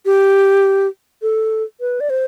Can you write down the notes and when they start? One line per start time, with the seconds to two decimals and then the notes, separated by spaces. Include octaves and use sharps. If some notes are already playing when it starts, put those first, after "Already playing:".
0.06 G4
1.22 A4
1.81 B4
2.00 D5
2.10 C5